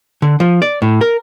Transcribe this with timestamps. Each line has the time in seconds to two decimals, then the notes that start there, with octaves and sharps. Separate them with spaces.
0.22 D3
0.40 F3
0.62 D5
0.82 A2
1.01 A#4